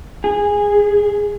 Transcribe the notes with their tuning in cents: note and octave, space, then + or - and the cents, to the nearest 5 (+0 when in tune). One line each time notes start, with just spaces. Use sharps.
G#4 -15